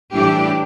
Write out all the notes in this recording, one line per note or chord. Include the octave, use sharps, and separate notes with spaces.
A2 E3 G3 D4 G4